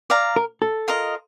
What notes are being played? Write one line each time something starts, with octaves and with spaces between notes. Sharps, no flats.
D5 F5 A#5
A#4
A4
F4 A#4 D#5